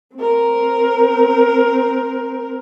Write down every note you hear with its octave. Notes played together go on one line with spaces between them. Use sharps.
C4 A#4